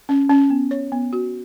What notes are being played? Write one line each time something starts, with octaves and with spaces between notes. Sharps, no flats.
C#4
C#4
B3
C#5
B3
F#4